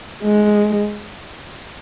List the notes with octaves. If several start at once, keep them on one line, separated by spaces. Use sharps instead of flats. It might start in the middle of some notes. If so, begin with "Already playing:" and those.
G#3